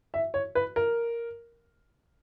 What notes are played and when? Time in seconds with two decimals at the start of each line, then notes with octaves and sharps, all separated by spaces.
0.14 E5
0.34 C#5
0.55 B4
0.76 A#4